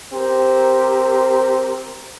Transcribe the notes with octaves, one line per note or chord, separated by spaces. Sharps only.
C4 G4 A#4 C5